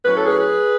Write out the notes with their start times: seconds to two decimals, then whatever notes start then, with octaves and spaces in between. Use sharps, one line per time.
0.05 A2 F#3 C#4 B4
0.16 A4
0.26 G#4 B4